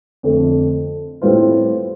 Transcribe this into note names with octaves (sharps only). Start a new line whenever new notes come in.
F2 D3 A3
A2 G3 C4 F4 B4